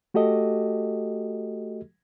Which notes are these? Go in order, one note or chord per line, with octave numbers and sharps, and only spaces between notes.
A3 F#4 G4 A4 D#5